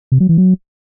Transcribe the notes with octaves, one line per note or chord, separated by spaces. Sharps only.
C3
F#3
E3
F#3